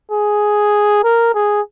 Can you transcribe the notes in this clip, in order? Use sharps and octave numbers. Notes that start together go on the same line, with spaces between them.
G#4
A#4
G#4